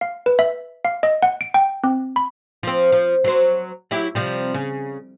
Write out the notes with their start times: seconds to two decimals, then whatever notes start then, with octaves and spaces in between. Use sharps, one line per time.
0.01 F5
0.26 B4
0.39 E5
0.85 F5
1.03 D#5
1.23 F#5
1.41 D7
1.54 G5
1.84 C4
2.16 B5
2.63 F3 C4
2.92 F3
3.24 F#3 C5
3.91 F#3 E4 G4
4.15 C3 F3 G3
4.54 C#3